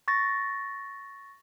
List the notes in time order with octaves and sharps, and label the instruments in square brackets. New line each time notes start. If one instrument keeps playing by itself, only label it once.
[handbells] C#6 A6 A#6